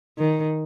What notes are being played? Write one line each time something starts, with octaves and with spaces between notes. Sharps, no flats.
D#3